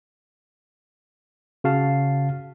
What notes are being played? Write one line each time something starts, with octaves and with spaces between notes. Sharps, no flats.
C#3 F#4 F5 A5